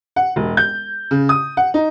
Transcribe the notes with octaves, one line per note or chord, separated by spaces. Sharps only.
F#5
E1
G6
C#3
D#6
F#5
D#4